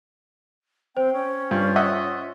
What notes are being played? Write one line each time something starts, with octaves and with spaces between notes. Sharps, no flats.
C4 C5 G5
C#4
G2 F4
D#5 E5 F#5